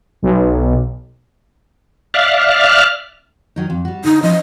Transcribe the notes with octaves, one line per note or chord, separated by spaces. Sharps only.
B1
D5 E5 F5 F6 F#6
D#3 F#3 D#4
F2
G3 F#4
D3 D#4
F3 C#4 C5 D#5